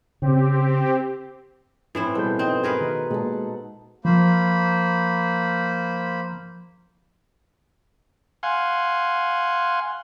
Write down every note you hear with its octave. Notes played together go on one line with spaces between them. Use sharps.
C#3 C4 G4
A2 E3 C4 E4
B2 G3 G#4 A4 C5 G6
C4 D#4 G6
G#4 A#4 B4
D#3
A#2 G#3 F#5 A5
F3 A#3 C5 B5
F5 F#5 G#5 C6